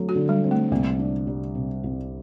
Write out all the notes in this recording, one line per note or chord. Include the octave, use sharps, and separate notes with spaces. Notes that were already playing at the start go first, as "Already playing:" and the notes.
Already playing: D3 F#3 A3 C4
F#4
D3
G3
C4
A3
C2 A#3
D4
G3
C3
C2